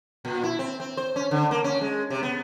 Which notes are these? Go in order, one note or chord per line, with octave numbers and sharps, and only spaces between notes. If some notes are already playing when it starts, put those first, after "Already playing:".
A#2
E4
C4
C4
C5
C#4
D3
A#3
C#4
G#3
C3
B3